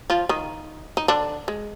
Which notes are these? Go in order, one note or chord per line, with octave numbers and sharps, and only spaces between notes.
F3 F4
D#3 D#4
D#4
D3 D4
G#3